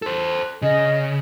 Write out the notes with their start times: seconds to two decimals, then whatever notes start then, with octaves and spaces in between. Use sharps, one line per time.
0.02 A4 C5
0.62 C#3 D#5